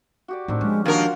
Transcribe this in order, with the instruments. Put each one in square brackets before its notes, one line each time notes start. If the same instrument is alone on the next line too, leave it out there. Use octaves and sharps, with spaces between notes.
[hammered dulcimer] F#4 G4 D5
[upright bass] A2 [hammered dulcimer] D#3 C4 D4
[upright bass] F3 [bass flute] G#3 [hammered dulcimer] C#4
[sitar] D#2 A#4 [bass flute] D4 [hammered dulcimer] F4 F#4